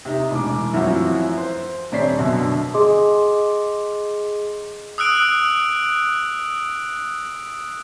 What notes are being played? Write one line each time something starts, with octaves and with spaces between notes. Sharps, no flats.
C3 D#4
E1 A2 D6
F#2 E3 F3 C4 E4 F#4
C5
D#1 C4 C#5 D5 B6 C7
F#2 B2 D3
G#4 D#5 C6 D6
D#6 E6 F#6 D7